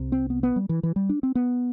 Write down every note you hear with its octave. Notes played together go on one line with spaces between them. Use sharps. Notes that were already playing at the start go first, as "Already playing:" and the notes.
Already playing: C2 C3
C4
B3
B3
G3
E3
E3
G3
D4
C4
B3